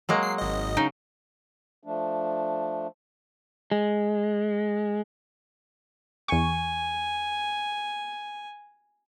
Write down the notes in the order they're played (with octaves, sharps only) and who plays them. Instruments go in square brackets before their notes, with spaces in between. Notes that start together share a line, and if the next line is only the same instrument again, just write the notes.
[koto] F#3 G#3 A#3
[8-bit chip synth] C7
G#1 D#5
[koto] C#3 [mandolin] D#4
[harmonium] F3 A3 D4
[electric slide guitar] G#3
[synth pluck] E2 C#6 [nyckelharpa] G#5